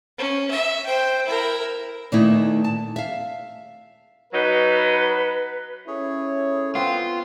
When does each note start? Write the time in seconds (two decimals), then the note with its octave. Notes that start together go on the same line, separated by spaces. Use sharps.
0.18 C#4
0.51 E5
0.86 C5 G5
1.26 E4 A#4
2.12 A#2 D#3 A3 B3 D#4 E4
2.64 A5
2.96 E5 F5
4.33 F#3 D#4 B4
5.88 C#4 E4 G#4 A4 C#5
6.75 B3 C4 F4 B4